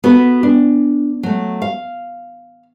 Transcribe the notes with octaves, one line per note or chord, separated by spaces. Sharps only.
B3 F#4 A4 B4
D4
F#3 A3
F5